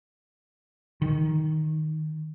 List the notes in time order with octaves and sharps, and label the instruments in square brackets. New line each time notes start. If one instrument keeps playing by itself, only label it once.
[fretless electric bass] D#3